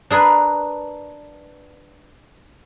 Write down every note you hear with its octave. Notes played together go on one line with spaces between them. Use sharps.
D4 G#4 A#4 B4 B5